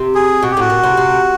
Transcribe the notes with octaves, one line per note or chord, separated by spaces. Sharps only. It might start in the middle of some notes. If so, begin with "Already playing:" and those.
Already playing: C3
G#4
B2 F#4
G4
A2 F#4
A#2
C3
C3